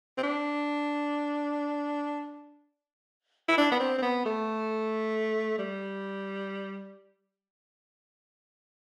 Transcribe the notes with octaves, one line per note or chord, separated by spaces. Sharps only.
C4
D4
E4
D4
B3
C4
C4
B3
A3
G3